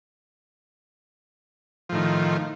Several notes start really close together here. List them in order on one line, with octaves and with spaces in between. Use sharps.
F3 A2 D#3